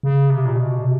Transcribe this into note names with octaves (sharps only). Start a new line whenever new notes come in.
C#3
C3
A#2
B2
C3